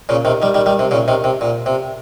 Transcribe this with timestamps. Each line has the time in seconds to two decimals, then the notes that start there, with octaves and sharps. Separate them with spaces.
0.09 A#2 C#3
0.25 C3 D#3
0.42 D#3 G3
0.54 D#3 G3
0.66 D#3 G3
0.79 C3
0.91 A#2 C#3
1.08 C3 D#3
1.24 C3
1.41 A#2
1.66 C3